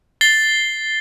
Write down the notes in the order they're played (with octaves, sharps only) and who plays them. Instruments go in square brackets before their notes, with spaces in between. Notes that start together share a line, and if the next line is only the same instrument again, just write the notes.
[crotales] A6 C7 G7